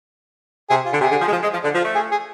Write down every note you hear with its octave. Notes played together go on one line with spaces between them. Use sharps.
C3 G#4
F4
D3
C3 G#4
D3
F3
G#3
F3
G#3
F3
D3
F3
A3
G#4
G#4